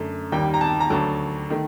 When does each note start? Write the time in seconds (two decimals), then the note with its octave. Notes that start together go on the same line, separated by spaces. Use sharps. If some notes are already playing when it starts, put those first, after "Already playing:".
Already playing: F#2 D3 A3
0.32 D#2 D#3 G3 G5
0.54 A#5
0.61 A5
0.80 A#5
0.90 D2 D3 F#3 A5
1.50 D#3 A3